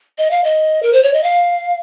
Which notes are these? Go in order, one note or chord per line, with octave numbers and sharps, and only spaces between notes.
D#5
F5
D#5
A#4
C5
C#5
D#5
F5